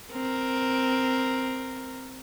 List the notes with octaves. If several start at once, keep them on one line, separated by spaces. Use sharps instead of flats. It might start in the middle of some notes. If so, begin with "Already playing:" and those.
C4 A#4